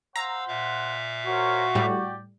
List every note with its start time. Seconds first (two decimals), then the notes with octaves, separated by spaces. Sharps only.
0.16 C5 F5 F#5 A#5 E6
0.48 A#2 E5 F5
1.26 F#4 A#4 C5 C#5
1.75 A2 G3 G4 D5 G5